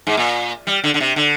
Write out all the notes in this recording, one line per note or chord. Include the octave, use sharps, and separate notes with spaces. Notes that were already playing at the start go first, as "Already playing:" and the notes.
G#2
A#2
G3
D3
D3
C3
D3